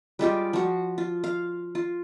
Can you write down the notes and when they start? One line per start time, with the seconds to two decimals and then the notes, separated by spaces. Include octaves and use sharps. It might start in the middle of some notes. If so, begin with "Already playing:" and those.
0.19 G3 G#3 F4 G4
0.53 F3 F#4
0.98 F4
1.24 F5
1.75 F4